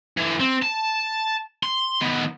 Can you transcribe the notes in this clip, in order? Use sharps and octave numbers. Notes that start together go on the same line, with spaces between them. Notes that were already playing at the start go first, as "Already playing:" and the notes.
D3 E3
C4
A5
C6
D#3 B3